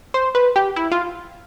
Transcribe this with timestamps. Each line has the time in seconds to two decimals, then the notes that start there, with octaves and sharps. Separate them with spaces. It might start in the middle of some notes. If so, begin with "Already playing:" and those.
0.14 C5
0.35 B4
0.56 G4
0.76 E4
0.91 F4